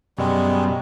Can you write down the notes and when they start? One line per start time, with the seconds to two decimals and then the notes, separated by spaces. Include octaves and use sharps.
0.18 F#2 B2 G3 G#3